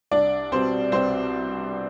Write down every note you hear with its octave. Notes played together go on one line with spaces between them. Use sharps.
C2 D4 D5
B2 G3 C4 C5
C2 C4 C5